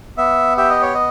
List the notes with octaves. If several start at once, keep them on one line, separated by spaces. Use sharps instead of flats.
B3 E5
G4 E5
D#5
C#5
D#5